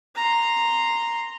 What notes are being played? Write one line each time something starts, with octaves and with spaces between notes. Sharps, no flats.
A#5 C6